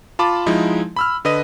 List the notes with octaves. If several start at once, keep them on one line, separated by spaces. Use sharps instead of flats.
F4 A5 B5 D6
F3 G#3 D#4 E4
B5 E6 F6
D3 B4 D#5 D#7